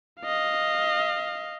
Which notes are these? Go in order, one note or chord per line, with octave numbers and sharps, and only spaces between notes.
D#5 F5